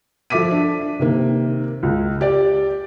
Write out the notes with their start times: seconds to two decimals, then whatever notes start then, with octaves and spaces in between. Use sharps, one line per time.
0.30 F3 A4 E5 D6 B6 D#7
0.51 D4
0.99 C3 D#3 A#3
1.83 C#2
2.21 G4 D5